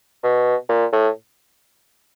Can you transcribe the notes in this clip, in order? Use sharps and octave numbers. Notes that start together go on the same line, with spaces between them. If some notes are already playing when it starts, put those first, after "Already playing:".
B2
A#2
A2